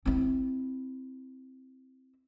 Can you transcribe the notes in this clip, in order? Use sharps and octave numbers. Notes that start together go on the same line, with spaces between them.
C4 E4